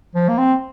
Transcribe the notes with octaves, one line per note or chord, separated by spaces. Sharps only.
F3
A#3
C4